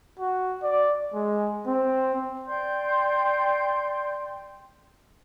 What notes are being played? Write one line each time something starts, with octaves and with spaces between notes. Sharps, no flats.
F#4
D5
G#3
C4
D5 G5 C6 G6